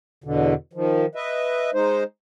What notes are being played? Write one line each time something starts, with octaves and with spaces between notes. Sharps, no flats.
E2 B2 D3
D#3 F3
B4 D#5 E5
G#3 D#4 C5